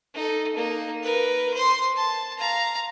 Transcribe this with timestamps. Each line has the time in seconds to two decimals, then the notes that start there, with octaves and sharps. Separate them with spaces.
0.14 D#4 A4
0.56 A#3 D#4
1.03 A#4 B4
1.54 C5 C6
1.96 A5
2.39 F5 A#5